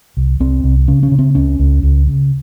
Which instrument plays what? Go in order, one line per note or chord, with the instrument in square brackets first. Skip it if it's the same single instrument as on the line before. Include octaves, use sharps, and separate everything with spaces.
[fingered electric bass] C2
C2 C4
C2
C#3 C#4
C#4
C#3
C4
C#2 C#4
C#2
C#2
C#3